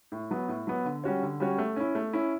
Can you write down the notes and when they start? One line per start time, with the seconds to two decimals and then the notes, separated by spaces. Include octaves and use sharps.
0.12 A2
0.31 F#3 B3
0.48 A2
0.67 F#3 B3
0.85 D3
1.04 G3 C#4 F#4 C#5
1.23 D3
1.40 G3 C#4 F#4 C#5
1.58 A3
1.76 C#4 E4
1.95 A3
2.13 C#4 E4